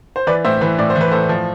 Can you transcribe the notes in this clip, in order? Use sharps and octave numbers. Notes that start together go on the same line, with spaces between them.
C5
E3 B4 D5
A2 C5 E5
E3 B4
A2 D5
C5
E3
B4
A2 A4 C5
F3